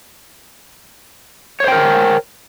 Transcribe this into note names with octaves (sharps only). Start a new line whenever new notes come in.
A#4 C5 C#5 G5